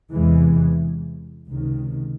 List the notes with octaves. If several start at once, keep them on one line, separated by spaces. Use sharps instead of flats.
E2 C3 E3 G#3
C#2 C3 D#3